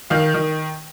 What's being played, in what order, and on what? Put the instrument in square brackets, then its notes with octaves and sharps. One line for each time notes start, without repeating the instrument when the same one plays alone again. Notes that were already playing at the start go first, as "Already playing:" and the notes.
[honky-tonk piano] D#3 F5
D#3